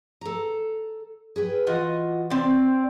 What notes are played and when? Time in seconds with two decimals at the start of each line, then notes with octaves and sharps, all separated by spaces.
0.21 A4 A#5
1.36 G#4 B4 G5
1.67 E3 F4 F#4 D#5
2.30 C4 D5